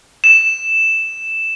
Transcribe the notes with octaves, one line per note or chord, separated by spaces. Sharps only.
E7